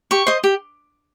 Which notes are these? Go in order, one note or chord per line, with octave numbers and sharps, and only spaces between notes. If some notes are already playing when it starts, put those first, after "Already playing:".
G4 C#6
C5 D#5
G4